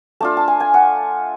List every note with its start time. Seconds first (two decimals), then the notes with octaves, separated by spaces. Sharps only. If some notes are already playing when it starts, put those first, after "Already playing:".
0.20 A3 D4 F4 A5
0.37 A5
0.48 G#5
0.60 G#5
0.74 F#5